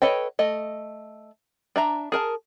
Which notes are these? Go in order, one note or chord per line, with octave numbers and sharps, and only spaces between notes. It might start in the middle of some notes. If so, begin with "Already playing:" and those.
A4 B4 C#5 D#5 G5
A3 D#5
D4 E5 A#5
G#4 A#4 A5